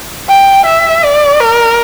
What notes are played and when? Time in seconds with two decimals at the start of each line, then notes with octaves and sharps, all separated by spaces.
0.28 G5
0.66 E5
1.04 D5
1.40 A#4